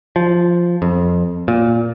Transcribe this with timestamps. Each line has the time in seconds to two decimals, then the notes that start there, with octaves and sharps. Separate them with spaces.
0.16 F3
0.82 F2
1.48 A#2